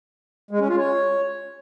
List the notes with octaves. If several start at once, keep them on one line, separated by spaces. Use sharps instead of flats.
G#3
C#4
F4
C#5